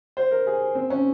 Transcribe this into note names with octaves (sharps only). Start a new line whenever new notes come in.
C5
A#4
G#4
C4
C#4